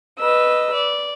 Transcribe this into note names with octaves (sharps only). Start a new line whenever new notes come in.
B4 D#5 E6
D5